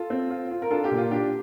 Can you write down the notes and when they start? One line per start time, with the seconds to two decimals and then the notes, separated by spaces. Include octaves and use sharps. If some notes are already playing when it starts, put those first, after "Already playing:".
Already playing: F4 A4
0.10 C4
0.30 F4
0.51 F4
0.62 A#4
0.71 D4 F4 A4
0.84 G4
0.91 A#2
0.97 F4
1.11 D4 G4